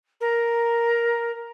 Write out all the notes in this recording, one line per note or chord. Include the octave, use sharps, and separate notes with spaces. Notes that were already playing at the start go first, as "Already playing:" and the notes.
A#4